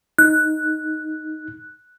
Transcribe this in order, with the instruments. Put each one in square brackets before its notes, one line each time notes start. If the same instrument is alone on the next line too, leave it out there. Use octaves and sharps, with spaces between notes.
[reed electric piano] D#4 [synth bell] F#6